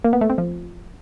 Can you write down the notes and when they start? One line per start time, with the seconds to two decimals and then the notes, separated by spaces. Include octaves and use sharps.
0.04 A#3
0.13 B3
0.21 A3
0.30 C4
0.38 F3